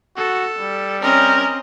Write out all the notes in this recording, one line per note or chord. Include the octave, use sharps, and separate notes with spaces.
F#4 A4
G3
C4 C#4 A#4 D#5